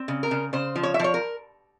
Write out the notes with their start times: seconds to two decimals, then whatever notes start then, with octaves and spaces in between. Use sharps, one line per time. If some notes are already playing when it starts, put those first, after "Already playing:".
Already playing: C4
0.08 C#3
0.23 A#4
0.31 C#3
0.53 C#3 C5
0.76 F3
0.83 C#5
0.94 E5
0.99 F3 C#5
1.14 A#4